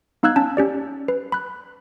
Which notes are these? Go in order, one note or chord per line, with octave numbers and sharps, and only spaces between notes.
B3 D#4 F5 E6 F#6 G#6
C#4 A5
C#4 G4 D5
B4
B5 F#6